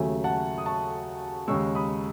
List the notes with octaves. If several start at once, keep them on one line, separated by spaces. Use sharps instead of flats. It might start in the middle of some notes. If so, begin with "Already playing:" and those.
Already playing: D#2 C#3 F#3 A3 E5 G#5
F#5 A5
D#6
A5 C#6
D#2 C#3 G#3 C#6 E6
B5 D#6